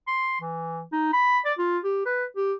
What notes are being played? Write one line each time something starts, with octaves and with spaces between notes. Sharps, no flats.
C6
E3
D#4
B5
D5
F4
G4
B4
G4